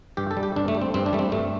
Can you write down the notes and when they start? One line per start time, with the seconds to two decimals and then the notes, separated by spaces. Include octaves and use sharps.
0.17 G2 G4
0.31 A4
0.37 G3
0.43 G4
0.56 G2 D4
0.68 A3
0.75 G3
0.82 C4
0.94 G2 C4
1.06 D4
1.13 G3 A3
1.19 C4
1.32 G2 A3